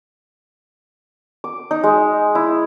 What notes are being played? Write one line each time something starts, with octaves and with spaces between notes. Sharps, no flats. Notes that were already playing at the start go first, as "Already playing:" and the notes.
D6
D#4
G#3
E4